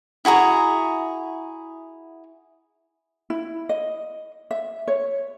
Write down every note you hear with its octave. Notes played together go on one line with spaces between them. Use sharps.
E4 F#4 G#4 A#5
E4
D#5
E5
C#5